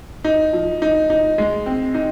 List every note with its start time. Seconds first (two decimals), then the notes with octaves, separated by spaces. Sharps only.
0.24 D#4
0.53 F3
0.82 D#4
1.10 D#4
1.38 G#3
1.66 C4
1.94 D#4